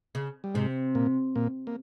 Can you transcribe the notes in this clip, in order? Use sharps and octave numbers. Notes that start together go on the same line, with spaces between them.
C#3
G3
G#2 C3 G#3
A#2 A#3
A#2 A#3
A#3